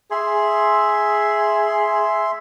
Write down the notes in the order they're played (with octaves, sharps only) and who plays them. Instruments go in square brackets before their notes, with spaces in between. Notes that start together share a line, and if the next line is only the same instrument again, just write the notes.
[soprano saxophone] G#4 [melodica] E5 C6